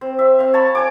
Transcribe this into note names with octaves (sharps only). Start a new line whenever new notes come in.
C4
E5
C4 F5
C#5 A5 B5 C#6
C#5 G#5 D6